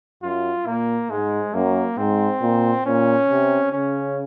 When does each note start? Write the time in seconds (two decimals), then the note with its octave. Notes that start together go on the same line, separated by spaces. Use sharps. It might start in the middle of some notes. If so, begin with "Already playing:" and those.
0.23 F#2 F4
0.66 A#2 A#3
1.10 G#2 G#3
1.54 F#2 A#3
1.98 G#2 C4
2.42 A#2
2.85 A#2 C#4
3.29 C3
3.72 C#3 C#4